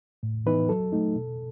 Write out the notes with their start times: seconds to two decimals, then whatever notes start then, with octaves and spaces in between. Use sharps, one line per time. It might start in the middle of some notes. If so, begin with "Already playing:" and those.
0.23 A2
0.46 E3 B3 D#4 B4
0.69 F#3 A4
0.93 A3 D#4
1.15 B2